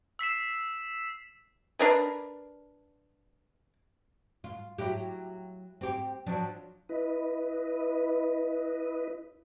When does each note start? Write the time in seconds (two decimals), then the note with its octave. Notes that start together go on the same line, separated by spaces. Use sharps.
0.19 E6 B6 C7 E7
1.79 D4 A#4 B4
4.44 F4
4.78 F#3 E4 G4
5.81 C4 G4
6.26 F3 F#3 D4
6.89 E4 B4 D#5